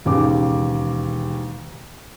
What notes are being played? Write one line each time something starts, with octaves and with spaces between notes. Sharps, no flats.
E1 D#2 C#3 D6